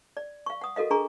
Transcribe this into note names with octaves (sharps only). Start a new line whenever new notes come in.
D5
F5 C#6
F#5 D#6
F#4 A4 A#4 D#5 F5
D4 G#4 A#4 A#5 C#6